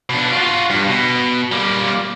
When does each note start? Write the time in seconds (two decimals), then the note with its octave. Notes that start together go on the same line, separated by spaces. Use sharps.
0.10 B2 D4
0.32 F4 F#4
0.70 G2
0.88 B2
1.52 G3 A#3